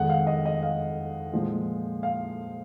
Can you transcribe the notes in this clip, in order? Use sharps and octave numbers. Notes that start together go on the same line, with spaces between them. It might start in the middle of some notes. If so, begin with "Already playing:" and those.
Already playing: F2 D#3 G#3 F#5
F5
D#5
D#5
F5
A#2 F3 G#3
F5